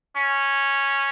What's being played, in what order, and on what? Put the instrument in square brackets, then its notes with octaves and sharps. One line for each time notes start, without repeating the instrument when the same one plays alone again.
[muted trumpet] C#4